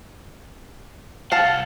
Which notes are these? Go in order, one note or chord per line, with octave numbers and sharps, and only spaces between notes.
C2 F5 F#5 A5